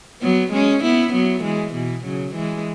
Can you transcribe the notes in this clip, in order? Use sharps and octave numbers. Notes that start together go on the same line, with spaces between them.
F#3 B3
G#3 C#4
B3 E4
F#3 B3
E3 G#3
B2 E3
C#3 F#3
E3 G#3